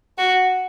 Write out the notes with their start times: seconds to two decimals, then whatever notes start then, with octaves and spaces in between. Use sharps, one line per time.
0.18 F#4